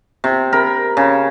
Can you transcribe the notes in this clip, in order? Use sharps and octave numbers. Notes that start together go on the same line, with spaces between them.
C3
A#4 B5
C#3